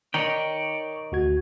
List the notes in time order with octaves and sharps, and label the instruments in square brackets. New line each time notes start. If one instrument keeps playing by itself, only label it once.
[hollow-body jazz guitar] D#3 D#4 [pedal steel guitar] C#5 D5 G5 [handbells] A#5 [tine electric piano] C#6
[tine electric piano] D2 F#4 G#6